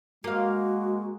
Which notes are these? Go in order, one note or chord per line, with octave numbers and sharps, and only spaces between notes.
G#3 A#3 F#4 F5